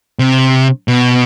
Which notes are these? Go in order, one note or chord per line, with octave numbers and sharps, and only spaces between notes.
C3
B2